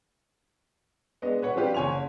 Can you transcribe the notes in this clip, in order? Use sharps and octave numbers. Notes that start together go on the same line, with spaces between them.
G#3 B3 D4 D#5
B4 C#5 F#5
F3 C4 D4 F4 G4 B4
F#1 C#5 G#5 C6 F7